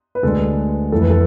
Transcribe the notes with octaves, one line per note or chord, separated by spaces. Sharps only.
B4
D2 D3 G#3 A4
F2 E3 A3 A4
B4
A4